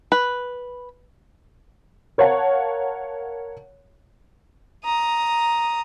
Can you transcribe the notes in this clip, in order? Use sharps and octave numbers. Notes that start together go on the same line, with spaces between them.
B4
A#4 C#5 F5 F#5 A5
A#5 D#6